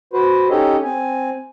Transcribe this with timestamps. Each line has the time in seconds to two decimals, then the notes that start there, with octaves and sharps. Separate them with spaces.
0.13 F#4 B4 C5
0.50 C#4 D#4 G4 A4 C#5 D#5
0.83 C4 G#5